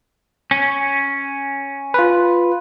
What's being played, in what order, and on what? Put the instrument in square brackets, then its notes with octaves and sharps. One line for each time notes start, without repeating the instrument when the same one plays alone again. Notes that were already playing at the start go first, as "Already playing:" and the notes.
[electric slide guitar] C#4
[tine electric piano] F4 B4